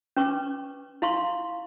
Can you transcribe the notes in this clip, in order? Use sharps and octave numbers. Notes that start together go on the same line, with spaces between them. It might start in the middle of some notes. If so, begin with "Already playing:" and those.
C#4 B4 C#6 D6
E4 F5 C6 C#6